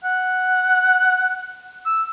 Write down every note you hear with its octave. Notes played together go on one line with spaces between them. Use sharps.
F#5
E6